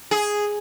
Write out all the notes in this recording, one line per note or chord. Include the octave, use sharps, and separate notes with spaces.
G#4